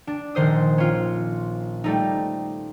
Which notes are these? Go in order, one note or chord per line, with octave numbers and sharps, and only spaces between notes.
D4
A#1 D#3 C5 D#6
C#4 F4
G3 A3 D#4